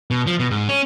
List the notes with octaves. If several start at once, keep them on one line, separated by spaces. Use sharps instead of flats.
B2
F3
B2
G#2
C#4